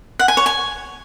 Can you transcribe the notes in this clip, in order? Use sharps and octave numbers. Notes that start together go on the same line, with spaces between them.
F#5
G#5
C#5
G#5